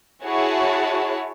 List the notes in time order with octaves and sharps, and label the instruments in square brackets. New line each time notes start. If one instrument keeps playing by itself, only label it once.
[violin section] E4 F#4 G#4 C#5 A5